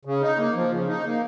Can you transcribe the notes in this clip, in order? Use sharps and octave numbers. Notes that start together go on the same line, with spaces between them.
C#3
D#4
A#3
F3
C#3
D#4
A#3